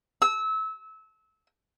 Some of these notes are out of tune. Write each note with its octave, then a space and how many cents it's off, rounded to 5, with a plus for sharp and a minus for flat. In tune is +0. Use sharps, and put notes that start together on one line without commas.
E6 -25